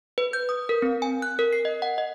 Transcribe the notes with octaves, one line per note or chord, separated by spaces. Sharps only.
B4
G6
D#6
A#4
C4
G#5
F#6
A#4
C7
D#5
F#5
D#5